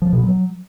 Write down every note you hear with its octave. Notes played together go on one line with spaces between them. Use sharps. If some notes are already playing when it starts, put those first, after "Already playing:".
F3
B2
F#3